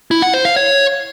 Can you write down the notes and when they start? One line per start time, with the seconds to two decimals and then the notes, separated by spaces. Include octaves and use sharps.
0.11 E4
0.22 F#5
0.34 C5
0.45 F5
0.56 C#5